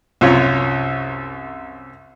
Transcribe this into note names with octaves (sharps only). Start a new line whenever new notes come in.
C2 F#2 F4 C#5